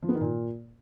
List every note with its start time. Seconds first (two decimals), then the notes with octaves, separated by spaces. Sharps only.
0.03 F3
0.09 B3
0.15 D#3
0.21 A#2